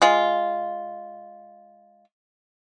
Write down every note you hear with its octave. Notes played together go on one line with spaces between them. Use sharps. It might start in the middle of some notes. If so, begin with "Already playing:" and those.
G#3 F4